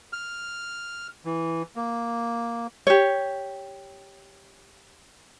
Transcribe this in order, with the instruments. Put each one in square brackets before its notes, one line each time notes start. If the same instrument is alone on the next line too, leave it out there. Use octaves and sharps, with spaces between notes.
[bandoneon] F6
E3
A#3
[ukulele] G4 C#5